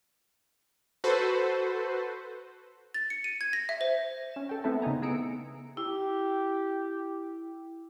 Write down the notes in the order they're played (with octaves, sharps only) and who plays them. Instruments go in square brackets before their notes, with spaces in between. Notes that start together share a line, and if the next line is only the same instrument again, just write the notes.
[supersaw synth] F#4 A4 B4 C5
[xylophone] A6
C#7
D#7
G#6
A#6
E5
C5
[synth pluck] C#4 E7
A4 G5
A3 B3 C4 E4 A4
C#3 C4 D#4 G#5 A#5
B3 G#4 A#5 E6 C#7 D7
[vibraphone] E4 [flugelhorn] G4